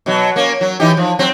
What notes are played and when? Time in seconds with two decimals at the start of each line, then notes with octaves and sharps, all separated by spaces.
0.06 B2 F#3
0.36 A#3 C#4
0.61 F#3
0.80 E3 D#4 G4
0.97 F3
1.19 F#3 C4